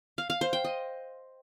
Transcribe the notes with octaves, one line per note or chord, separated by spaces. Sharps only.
F5
F5
C5
G5
D#5